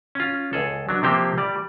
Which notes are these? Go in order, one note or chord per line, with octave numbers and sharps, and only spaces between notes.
C#4 F4
C#2 G#4 A4
F#3 D4
C3 F3 A#3 C4 G4 C5
G3 D5